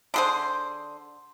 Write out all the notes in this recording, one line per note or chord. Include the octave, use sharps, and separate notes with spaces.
D3 G#4 C5